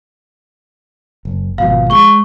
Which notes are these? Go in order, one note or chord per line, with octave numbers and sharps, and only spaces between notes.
F#1
G#1 B2 F3 F5
G#3 C#6 G7